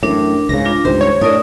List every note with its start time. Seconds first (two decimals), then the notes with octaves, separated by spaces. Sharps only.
0.03 A1 F#2 A2 D4 A#4
0.49 C#2 G#2 C#3 A#6
0.65 D4 F4
0.85 C#2 G2 D#3 G4 C5
1.01 C#5
1.21 A2 D4 A#4 D5 D#5 D#6